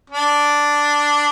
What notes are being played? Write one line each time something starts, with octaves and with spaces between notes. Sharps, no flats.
D4